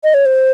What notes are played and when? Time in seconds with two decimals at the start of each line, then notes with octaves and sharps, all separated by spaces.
0.04 D#5
0.14 C#5
0.26 C5